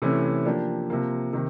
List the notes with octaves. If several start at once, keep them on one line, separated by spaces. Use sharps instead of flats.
C3 E3 A3 C#4 E4
F3 A#3 D4 G4
C3 F3 A#3
C3 D#3